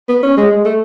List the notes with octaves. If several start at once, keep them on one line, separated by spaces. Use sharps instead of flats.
B3
C#4
G#3
G#3
A3